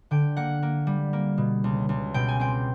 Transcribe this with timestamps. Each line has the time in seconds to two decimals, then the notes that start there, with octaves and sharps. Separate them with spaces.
0.11 D3 G5
0.37 A#3 F#5
0.62 A#3
0.87 G3
1.13 A#3
1.38 B2
1.64 C#2
1.89 C#2
2.14 B2 G5
2.28 G#5
2.40 C4 G5